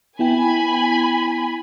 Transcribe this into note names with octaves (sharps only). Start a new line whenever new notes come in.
B3 E4 G5 G#5 B5